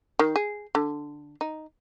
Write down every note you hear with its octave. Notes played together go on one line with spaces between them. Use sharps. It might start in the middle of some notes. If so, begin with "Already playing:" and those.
D#3
G#4
D3
D#4